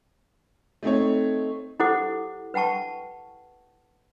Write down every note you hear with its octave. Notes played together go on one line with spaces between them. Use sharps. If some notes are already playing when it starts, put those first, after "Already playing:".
A3 C4 D#4 C#5
E4 G4 A4 C5 F#5 D6
B4 F#5 G5 A5 C#6